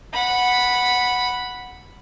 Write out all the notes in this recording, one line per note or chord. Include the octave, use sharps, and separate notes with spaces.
F#5 B5